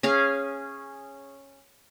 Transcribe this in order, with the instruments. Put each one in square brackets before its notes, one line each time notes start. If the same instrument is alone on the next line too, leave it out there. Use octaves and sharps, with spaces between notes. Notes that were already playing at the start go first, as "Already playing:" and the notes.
[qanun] C#4 G#4 F5